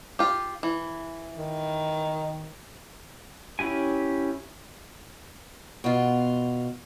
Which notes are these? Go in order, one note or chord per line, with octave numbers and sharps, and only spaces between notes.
F4 G4
E3
D#3
C#4 E4 G4 G#5
B2 F4